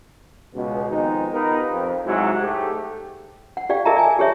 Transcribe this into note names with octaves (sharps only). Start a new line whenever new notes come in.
C#2 B2
F2 D#3 G#3 B3 D#4
B3 D#4 F4 G4 A#4 B4
F2
G#2 C3 F#3 G#3 E4 F#4
G#2 A3 G4
F#5
G4 D5 F5 G5
G#4 A#4 D#5 E5 A5 A#5
D5 G#5
G4 G#4 C#5 E5